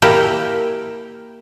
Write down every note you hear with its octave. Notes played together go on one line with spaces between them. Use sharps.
A#3 E4 G4